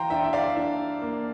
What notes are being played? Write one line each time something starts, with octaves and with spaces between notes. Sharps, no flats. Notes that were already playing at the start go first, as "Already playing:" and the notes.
Already playing: E3 F5 G5 A#5 C6
D4 E5 G5
E5
D5 F5
D4
A#3